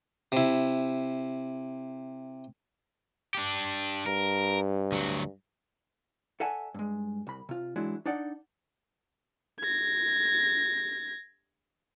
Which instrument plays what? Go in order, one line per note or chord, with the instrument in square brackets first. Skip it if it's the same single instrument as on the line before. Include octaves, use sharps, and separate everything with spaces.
[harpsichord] C3 E4
[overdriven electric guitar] D4 G4
[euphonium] G2 [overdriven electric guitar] A#4
[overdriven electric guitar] D2 F#3
[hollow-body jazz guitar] A4 D5 E5 F#5 G#5 A5
G2 G#3
C2 B5
C3 F4
G#2 E3 F#3 G#3 D4 E4
D4 D#4 D5 F#5
[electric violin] G#6 A#6